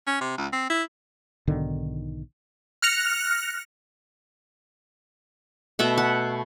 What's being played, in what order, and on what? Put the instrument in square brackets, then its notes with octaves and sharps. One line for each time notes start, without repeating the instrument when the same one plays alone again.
[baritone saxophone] C#4
C3
C#2
C4
E4
[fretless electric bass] B1 G#2 D3 D#3
[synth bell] F6 F#6 A#6 C#7 F7
[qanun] B2 A3 E5 F#5
F#5